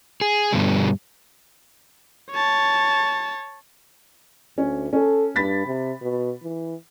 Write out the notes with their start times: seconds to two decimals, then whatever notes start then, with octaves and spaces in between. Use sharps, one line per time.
0.21 G#4
0.52 G2 B2 D3 G3
2.31 C#5 A5
4.58 D2 C#4
4.93 C#4 A4
5.36 G2 B5 A6 B6
5.67 C3
6.02 B2
6.42 E3